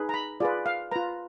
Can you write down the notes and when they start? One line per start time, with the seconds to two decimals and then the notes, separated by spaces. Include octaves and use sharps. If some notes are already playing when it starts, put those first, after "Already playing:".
Already playing: D#4 G#4 B4
0.09 A#5
0.14 B5
0.40 F4 G#4 B4 D5
0.66 F5
0.91 F4 B4 A#5